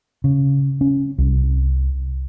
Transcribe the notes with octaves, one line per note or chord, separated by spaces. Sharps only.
C#3
C#4
C2